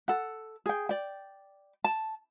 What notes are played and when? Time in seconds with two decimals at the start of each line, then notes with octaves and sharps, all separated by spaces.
0.08 A4 F#5
0.66 G#4 G5
0.89 D5 G5
1.84 A5